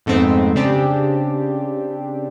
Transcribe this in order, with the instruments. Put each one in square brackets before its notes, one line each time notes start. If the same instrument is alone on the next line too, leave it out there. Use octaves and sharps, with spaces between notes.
[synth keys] F2 G#2 A3 B3 C4
C#3 C4 D4 G4